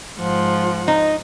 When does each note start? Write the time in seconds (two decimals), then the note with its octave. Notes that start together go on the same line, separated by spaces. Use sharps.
0.20 G#2 F3 F#5
0.88 D#4